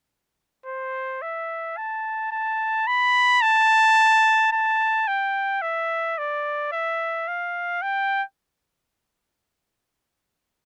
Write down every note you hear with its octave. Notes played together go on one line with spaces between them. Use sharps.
C5
E5
A5
A5
B5
A5
A5
G5
E5
D5
E5
F5
G5